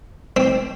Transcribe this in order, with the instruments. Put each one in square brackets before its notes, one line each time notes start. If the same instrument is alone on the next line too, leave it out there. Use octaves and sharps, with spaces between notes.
[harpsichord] C4